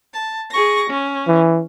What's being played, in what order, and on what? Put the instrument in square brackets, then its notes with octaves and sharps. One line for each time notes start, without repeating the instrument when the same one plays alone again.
[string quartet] A5
G#4 C#6 A#6
C#4
[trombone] E3